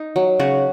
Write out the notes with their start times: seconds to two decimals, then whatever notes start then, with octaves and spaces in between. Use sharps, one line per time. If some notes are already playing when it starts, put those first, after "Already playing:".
Already playing: D#4
0.16 F#3
0.39 C#3 F#4